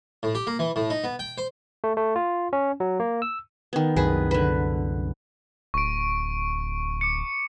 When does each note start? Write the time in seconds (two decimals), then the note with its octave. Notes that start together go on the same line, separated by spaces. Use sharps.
0.23 A2
0.35 G4
0.47 A#3
0.59 E3
0.76 A2
0.90 D#4
1.04 B3
1.19 G5
1.38 C5
1.84 A3
1.97 A3
2.16 F4
2.53 C#4
2.80 F#3
3.00 A#3
3.22 E6
3.73 D#3 B3
3.96 C2 F#2 G#4 B4
4.31 D3 B4
5.74 D1 C#6 D7
7.01 D6 C#7